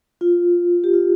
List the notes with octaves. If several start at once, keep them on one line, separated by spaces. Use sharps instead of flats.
F4
G4
F4